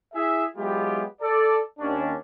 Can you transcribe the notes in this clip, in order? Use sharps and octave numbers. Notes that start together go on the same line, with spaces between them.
E4 G#4 E5
F#3 G#3 B3 E4 F4 G4
A4 D5
D#2 C#4 D4